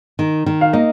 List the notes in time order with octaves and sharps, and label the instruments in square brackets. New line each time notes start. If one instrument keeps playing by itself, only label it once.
[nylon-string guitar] D#3
D#3
[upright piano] F5
[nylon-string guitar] A#3 [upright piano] D#4 D#5